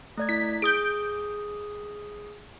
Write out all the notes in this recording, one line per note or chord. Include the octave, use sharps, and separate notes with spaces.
A3 D5 G#6
E4 B6
G#4 D#6 G6 D7